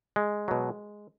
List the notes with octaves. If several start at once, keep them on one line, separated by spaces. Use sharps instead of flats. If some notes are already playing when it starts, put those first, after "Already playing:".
G#3
B2 F#3